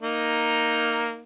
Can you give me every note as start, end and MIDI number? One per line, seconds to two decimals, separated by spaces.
0.02 1.21 58
0.02 1.21 63